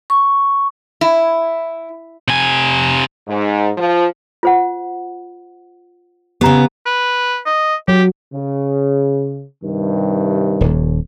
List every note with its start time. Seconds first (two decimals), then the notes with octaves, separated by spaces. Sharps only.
0.10 C#6
1.01 E4
2.28 C3 G#5
3.28 G#2
3.78 F3
4.43 F4 C5 F#5
6.41 C#3 B3 G4 A#5
6.86 B4
7.46 D#5
7.88 F#3 G4
8.33 C#3
9.64 G2 C3 D#3
10.61 D#1 D#2